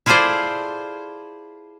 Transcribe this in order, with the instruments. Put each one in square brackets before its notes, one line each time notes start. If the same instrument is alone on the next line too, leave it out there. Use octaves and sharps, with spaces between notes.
[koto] E4 F4 G#4 A4 C5 D5